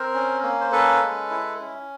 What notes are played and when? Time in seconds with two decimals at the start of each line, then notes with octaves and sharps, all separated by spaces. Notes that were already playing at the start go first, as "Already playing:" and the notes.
Already playing: C4 A#4 C5
0.14 C#4
0.43 A#3
0.61 C5
0.72 C#4 A4 B4
1.02 G#3
1.31 E4
1.60 C#4